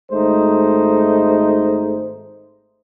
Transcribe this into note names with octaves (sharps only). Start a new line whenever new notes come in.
G#1 G#3 A3 D#4 C5